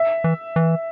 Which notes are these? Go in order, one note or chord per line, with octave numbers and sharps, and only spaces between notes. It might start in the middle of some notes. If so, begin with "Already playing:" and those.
Already playing: E5
E3
E3